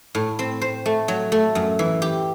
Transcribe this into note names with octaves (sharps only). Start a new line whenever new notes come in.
A2
C4
C5
A3
F#3
A3
F#2
E3
G4